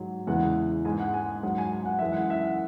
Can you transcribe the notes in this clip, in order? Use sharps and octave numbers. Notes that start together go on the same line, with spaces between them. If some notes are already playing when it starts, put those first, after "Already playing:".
Already playing: G#2 F#3
E2 C#3 E3 G#3 F#5
G#2 G#3 G#5
F#5
G#5
G#2 F#3 F#5
G#5
G#5
F#5
F#2 E3 G#3 E5
F#5
E5
F#5